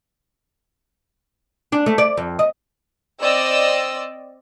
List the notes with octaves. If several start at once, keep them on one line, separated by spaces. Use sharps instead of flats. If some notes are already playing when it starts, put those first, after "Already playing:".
D4
A3
D5
F2
D#5
C4 D5 D#5 E6